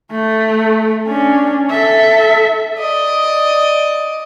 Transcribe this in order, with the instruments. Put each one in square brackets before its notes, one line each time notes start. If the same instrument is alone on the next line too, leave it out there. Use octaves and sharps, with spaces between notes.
[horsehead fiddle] A3
C#4 D4
A4 E5
[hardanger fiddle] D5 D#5